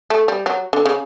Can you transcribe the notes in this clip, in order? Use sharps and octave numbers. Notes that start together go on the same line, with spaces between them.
A3
G3
F#3
D3
C#3